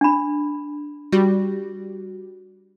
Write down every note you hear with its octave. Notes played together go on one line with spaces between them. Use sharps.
D4 B5
G3 F#4